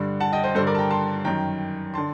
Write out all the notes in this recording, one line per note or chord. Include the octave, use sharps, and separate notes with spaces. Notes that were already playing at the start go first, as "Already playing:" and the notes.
Already playing: G2 D3
F#5 A5
D#5 G5
C5 D#5
G2 D3 A4 C5
A#4 D5
A5
G5 A#5
A5 C6
F#2 D#3 G5 A#5
D3 A5 C6